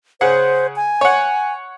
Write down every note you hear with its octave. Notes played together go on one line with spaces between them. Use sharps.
C#3 G#4 C5 F#5
G#5
C#5 F#5